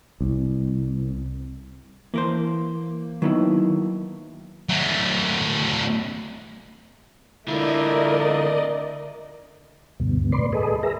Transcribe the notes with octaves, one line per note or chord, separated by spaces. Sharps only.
C2
E3 A#3 A#4 C5
D#3 F#3 B3 E4
F#3 A3
D3 A3 E4 F4 A#4 D5 D#5
D2 G2 B2
A2 B4 D5 C6
G#4 A4 B4 D#5
G#4 A#4 B4 E5 A#5